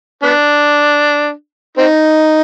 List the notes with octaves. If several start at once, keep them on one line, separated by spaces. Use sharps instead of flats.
B3 D4
C4 D#4